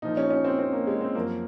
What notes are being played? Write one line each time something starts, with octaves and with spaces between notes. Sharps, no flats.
A#2 F3 D#4
C#4
C#4
C4
C4
A#3
G#3
C4
F#2 F3 A#3